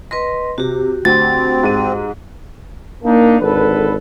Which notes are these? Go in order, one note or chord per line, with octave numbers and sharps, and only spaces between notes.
B4 D#5 C6 A#6
C3 F#4 G4
D2 C4 A6
G#2 D#7
A#3 D4 D#4
G#1 D3 A4 B4